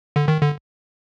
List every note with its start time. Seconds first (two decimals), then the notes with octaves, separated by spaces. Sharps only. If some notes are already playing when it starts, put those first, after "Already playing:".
0.16 D3
0.28 D#3
0.41 D3